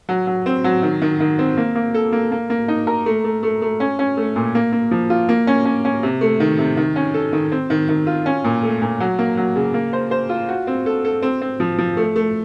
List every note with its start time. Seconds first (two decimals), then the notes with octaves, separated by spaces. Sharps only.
0.09 F#3
0.27 F#3
0.46 C4
0.64 F#3
0.83 D#3
1.02 D#3
1.20 D#3
1.39 C4
1.57 A#3
1.75 A#3
1.94 A4
2.12 A#3
2.32 A#3
2.50 A#3
2.68 D#4
2.87 A#4
3.06 A3
3.24 A3
3.43 A3
3.62 A3
3.80 C#4
3.99 C#4
4.17 A3
4.36 A#2
4.55 A#3
4.73 A#3
4.91 F3
5.10 F4
5.29 A#3
5.47 C#4
5.65 C#4
5.85 C#4
6.03 C3
6.21 A3
6.40 D#3
6.59 C3
6.77 D#3
6.96 C#4
7.14 A4
7.33 D#3
7.52 C4
7.70 D#3
7.89 D#3
8.07 F4
8.26 C#4
8.44 A#2
8.63 A3
8.82 A#2
9.00 F#3
9.19 A#3
9.37 F#3
9.56 C#3
9.74 A#3
9.93 C5
10.11 C5
10.29 F4
10.48 F#4
10.67 C4
10.86 A4
11.05 A4
11.22 C4
11.41 C4
11.60 F3
11.78 F3
11.97 A3
12.16 A3